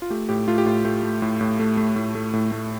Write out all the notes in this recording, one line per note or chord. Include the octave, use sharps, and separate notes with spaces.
F4
A3 G4
A2 G4
A3 F4
G4
A2 F4
A3 G4
A3
A2
A2
A3
A3
A2
A3
A2
A3